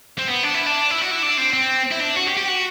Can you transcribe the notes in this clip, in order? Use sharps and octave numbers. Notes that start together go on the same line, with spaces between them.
C4
B3
D4
E4
D4
E4
F#4
E4
D4
C4
C4
E4
D4
F#4
G4
G4
F#4